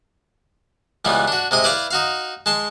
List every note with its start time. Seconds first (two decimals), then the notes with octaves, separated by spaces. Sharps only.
1.05 C#2 E3 G3 B3
1.28 D4 F#4
1.51 C3 G#3 D#5 D#6
1.64 E4 B4 D5 F5 D6
1.91 D#4 F#4 F5
2.46 G#3 A5 C6